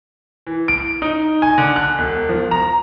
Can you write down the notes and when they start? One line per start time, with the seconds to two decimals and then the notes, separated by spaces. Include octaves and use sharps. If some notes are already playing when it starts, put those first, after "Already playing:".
0.47 E3
0.68 D7
1.02 D#4
1.42 G#5
1.58 D3
1.76 F#6
1.98 E1
2.29 F3
2.51 A#5